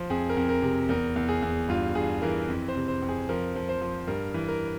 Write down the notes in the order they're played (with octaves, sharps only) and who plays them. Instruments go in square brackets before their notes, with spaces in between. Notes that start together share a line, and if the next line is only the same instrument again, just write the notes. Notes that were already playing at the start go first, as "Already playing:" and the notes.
Already playing: [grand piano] F3
F2 G#4
A#4
F2
A#4
C3
E2 A#4
E2
G#4
E2
G2 F4
G2 G#4
E3 A#4
F2
C5
C3
C5
F2
G#4
F3 A#4
F3
C5
F3
G2 A#4
E3
A#4